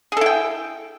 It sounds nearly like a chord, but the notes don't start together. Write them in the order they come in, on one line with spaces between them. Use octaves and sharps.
G#4 A4 E4 G5